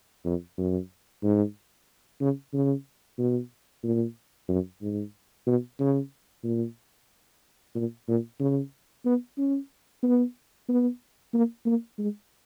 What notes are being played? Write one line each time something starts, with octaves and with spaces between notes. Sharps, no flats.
F2
F#2
G#2
C#3
C#3
B2
A#2
F#2
G#2
B2
C#3
A#2
A#2
A#2
C#3
B3
C#4
B3
B3
A#3
A#3
G#3